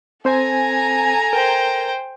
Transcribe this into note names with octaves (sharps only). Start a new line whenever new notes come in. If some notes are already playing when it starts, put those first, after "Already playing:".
C4 A4 C5 G#5 A#5
A#4 C5 G5